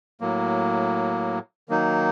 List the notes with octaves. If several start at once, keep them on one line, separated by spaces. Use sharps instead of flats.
A2 F#3 A#3
D#3 F#3 A#3 D#4